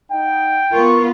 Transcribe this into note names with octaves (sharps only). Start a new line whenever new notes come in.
D#4 F#5 G5
B3 F4 A#4 C#6